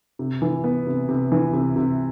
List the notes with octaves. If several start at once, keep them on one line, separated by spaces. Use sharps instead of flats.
C3
E3
B3
C3
C3
E3
C3
C3